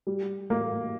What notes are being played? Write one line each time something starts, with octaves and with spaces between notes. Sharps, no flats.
G3
A#3